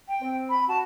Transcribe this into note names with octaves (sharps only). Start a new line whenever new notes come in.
G5
C4
B5
F#4 A5